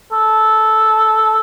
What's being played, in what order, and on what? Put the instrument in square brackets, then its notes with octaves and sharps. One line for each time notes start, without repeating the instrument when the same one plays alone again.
[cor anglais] A4